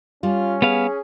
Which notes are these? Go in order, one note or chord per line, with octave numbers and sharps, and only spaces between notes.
G3 C#4 F4
B3 G#4 F5